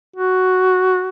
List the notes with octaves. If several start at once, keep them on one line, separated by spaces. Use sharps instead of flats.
F#4